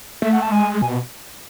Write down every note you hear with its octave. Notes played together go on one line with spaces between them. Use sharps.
A3 E5
F#5
A5
G#3 G#5
B2 G#5